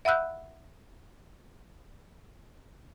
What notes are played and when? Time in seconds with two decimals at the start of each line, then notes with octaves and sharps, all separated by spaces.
0.05 E5 F#5 B5 E6 F#6 G6